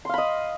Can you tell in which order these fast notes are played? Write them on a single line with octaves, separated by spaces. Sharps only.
C6 F5 B5 D#5